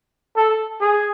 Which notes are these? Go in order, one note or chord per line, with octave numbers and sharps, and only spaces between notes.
A4
G#4